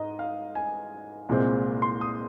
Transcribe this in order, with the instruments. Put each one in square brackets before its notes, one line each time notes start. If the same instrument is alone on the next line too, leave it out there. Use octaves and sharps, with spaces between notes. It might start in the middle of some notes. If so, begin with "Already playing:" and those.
Already playing: [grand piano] G#2 D#5 A#5
F5
G#5
C2 A#2 G#3 C4
C6
D#6